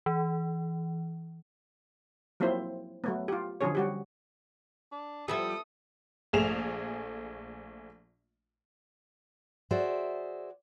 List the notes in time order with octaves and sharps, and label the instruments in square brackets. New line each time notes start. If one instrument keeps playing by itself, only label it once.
[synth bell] E3
[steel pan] F3 F#3 A#3 C4 E4 C5
F#3 A3 B3
F4 G4
D3 F3 F#3 C#4 G#4 C#5
G3 F#4 G4
[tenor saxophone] D4
[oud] F3 G3 [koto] B3 E4 E5 [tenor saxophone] A4 [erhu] D#6
[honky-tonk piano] A#1 A3 G#4 E7 F7
[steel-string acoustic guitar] F#4 G#4 C5 D5 E5